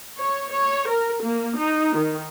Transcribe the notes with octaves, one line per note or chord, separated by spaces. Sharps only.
C#5
C#5
A#4
A#3
D#4
D#3